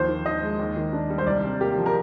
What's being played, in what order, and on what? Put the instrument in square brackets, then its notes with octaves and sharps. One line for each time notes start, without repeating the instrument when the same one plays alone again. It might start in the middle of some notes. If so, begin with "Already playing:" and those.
Already playing: [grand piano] D#2 F3 [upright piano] C5
[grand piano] D#3
[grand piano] D#4 [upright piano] D#5
[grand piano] G#3
D#2
D#3
D4
G3
[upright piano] C5
[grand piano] C2 [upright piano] D5
[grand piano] C3
[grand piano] A#3 [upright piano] G4
[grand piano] F3
[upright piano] A#4